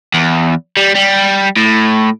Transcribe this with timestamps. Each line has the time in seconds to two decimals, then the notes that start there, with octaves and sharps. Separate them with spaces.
0.14 E2
0.77 G3
0.95 G3
1.57 A2